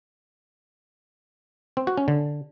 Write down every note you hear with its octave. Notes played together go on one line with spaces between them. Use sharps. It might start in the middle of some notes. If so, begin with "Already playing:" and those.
C4
F#4
C#4
D3